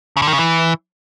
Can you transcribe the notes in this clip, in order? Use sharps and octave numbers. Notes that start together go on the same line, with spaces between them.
C#3
D3
D#3
C#3
E3